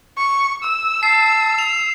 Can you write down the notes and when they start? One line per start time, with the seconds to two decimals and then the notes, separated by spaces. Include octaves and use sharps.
0.17 C#6
0.63 E6
1.03 A5 C7
1.59 F7